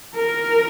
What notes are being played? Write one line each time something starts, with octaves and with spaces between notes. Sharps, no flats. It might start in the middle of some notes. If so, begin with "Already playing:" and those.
A#4